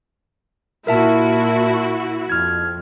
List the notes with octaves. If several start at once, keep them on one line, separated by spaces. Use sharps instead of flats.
A#2 E4 F#4 A#4 E5 A5
F2 F6 G#6